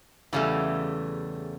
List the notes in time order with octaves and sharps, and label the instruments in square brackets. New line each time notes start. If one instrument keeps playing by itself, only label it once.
[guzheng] E2 C#3 C#4 [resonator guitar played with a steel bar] E3 G3 A3